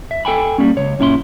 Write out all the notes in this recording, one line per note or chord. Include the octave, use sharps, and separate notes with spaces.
E5
A4 G5 G#5 B5
G3 A#3 C#4
C#2 C#5
F#2 A#2 C#4 E4 A#5 C6